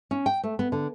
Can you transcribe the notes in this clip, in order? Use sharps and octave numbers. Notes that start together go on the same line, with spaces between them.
C#4
G5
A3
B3
D3